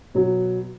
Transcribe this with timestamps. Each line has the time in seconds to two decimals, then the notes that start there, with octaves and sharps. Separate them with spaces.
0.15 B2 F#3